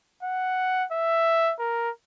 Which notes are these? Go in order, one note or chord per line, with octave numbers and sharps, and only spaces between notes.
F#5
E5
A#4